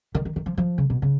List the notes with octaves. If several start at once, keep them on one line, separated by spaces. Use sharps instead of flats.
D#3
D#3
D#3
F3
F3
C#3
B2
C#3